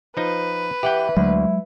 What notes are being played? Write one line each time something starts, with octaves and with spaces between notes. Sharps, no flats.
F3 D#4 B4
E3 G4 F#5 G5
D2 F#3 G#3 E4